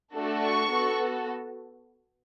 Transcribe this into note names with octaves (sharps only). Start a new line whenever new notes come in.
A3 D4 F#4 A4
C#6
B3 F#4 A4